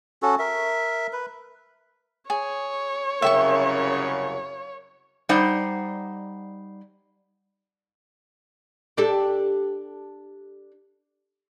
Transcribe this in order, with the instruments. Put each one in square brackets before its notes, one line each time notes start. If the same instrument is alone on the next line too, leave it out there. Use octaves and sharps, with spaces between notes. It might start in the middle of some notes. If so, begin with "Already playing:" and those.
[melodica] C#4 F#4 A4
A#4 E5
B4
[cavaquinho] G#4 [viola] C#5
[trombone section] C2 F#2 C#3 [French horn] A#4 [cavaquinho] E5 G5 C#6
[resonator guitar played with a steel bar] G3 D#4 C5 D5 F#5
[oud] D4 G4 A4